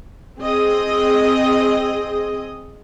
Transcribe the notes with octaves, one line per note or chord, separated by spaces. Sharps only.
C4 G#4 D#5